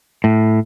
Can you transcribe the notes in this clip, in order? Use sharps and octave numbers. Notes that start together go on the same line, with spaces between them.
A2